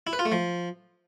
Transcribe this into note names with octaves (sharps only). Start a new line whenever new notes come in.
E4
B4
F4
A3
F3